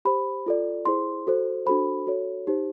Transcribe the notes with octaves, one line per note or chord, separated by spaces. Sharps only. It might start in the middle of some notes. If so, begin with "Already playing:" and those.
G4 C5 B5
F4 A4 D5
E4 G#4 C5 C6
F#4 A4 C5
D4 F#4 A4 C5 B5
F#4 A4 C#5
D#4 G4 C5